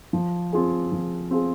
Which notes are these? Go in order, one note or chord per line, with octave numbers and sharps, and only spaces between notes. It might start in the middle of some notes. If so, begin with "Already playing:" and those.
F3
C4 F4 G#4
F3
C4 F4 G#4